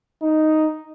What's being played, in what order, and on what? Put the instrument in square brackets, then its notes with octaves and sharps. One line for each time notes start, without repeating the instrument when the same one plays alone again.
[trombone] D#4